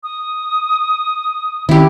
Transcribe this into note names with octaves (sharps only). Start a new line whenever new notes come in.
D#6
D#3 C4 C#4 E4 G4